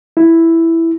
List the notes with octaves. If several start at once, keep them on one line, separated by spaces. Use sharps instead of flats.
E4